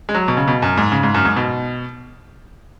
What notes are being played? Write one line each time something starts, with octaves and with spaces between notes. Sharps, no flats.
G#3
F#3
B2
C#3
B2
F#2
G#2
C#3
G#2
F#2
G#2
B2